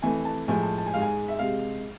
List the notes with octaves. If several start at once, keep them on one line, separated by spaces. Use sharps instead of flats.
F2 E3 A3 G#5
A5
A2 F3 G#3 G#5
A5
A5
G#5
G#2 G#3 F5 G#5
E5
C3 G#3 F5